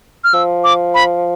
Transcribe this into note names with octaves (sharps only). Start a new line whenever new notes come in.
F6
F3 E6
D6
B5